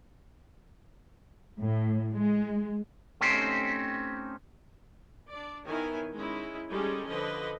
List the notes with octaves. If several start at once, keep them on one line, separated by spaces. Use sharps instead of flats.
A2
G#3
A3 C4 C#4 D#4 G4 C5
D4 D5
D#3 B3 E4 C#5 G#5
G#3 C#4 D#4 E4
G3 G#3 C#4 D#4 G#4 A4
D3 F3 A4 B4 D#5